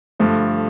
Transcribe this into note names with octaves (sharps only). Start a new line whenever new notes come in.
G2 D3 F3 A3